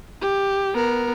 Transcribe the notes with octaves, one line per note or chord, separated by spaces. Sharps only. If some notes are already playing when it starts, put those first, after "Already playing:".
G4
B3 A#4